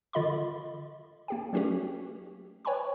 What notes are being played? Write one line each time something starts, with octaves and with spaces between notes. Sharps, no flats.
D3 F4 D#5 B5 C6
A#3 G4 G5
F#3 A3 C#4 F#4 G4
B4 C#5 G5 G#5 B5 C#6